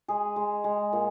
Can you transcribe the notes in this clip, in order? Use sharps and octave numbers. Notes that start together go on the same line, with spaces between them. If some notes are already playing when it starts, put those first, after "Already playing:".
G#3 G#4
G#3
G#3
A#2